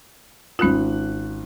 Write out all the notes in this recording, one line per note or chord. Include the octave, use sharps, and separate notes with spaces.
G#1 C#4 F4 F#6 F#7